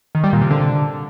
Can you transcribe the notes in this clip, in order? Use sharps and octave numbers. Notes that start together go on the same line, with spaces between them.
D#3
G3
A#2
C3
D3